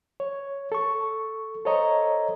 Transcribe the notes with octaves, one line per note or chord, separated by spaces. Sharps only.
C#5
A4 C#6
A4 C5 C#5 D#5 A#5